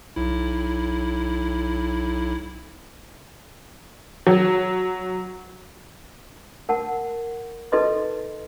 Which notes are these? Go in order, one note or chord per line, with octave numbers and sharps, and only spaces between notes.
B1 E4
F#3
A#4 F#5 A5
D#4 A4 B4 D#5 C6